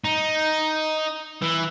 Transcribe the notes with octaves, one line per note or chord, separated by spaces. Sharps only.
D#4
E3